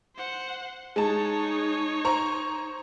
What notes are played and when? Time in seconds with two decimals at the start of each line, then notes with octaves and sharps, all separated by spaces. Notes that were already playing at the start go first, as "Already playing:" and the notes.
0.16 C5 F#5
0.96 G#3 D#4 C#5 A5
2.05 C5 A#5 C#6